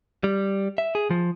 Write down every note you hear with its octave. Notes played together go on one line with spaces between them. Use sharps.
G3
E5
G#4
F3